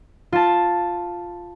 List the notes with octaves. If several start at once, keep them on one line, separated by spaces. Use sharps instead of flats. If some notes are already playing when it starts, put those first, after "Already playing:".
F4 A5